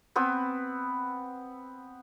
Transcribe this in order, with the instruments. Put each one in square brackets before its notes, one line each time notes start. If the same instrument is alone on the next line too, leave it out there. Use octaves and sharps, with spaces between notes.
[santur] B3 C4 B4 E6